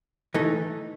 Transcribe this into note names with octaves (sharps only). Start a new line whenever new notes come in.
E3 A3 D#4